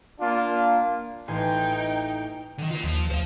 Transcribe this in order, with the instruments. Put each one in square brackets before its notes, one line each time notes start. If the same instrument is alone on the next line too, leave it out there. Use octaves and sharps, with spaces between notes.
[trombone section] A#3 D4 F4
[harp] A1 G#5 C6 [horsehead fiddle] D#4 G5
[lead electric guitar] D3 D#3
F4 A#4
[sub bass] D#2 [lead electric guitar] F3
[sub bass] D2 [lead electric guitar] C5 F5